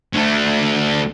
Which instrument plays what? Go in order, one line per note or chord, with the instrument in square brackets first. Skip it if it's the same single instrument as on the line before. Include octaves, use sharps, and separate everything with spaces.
[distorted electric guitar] D2 A3